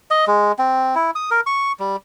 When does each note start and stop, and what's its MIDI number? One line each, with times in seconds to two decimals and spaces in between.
0.11 0.25 75
0.27 0.52 56
0.59 0.95 60
0.95 1.11 64
1.15 1.30 87
1.31 1.41 70
1.46 1.72 85
1.80 1.96 55